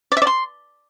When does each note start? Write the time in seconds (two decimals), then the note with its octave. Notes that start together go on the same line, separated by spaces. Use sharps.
0.12 D5
0.17 E5
0.22 D5
0.27 C6